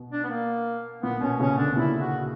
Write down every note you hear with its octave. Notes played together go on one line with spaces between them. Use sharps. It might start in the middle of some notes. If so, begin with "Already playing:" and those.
Already playing: B2
D4
B3
A#3
A#2 B3
B2 C#4
A#2 C#3 C#4
B2 D3 D4
A#2 C#3 E4
F#4